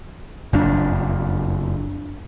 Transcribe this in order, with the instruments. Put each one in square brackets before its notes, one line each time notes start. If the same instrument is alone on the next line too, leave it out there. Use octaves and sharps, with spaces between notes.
[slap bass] F#1 F2 D4